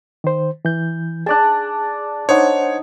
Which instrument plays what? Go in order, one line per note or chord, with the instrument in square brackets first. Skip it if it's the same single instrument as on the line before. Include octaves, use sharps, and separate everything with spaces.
[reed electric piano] D#3 C5
E3 G6
[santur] D4 D5 A5 [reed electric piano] G#4 F#6
[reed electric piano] D4 C5 F#5 [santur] D#4 [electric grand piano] C#5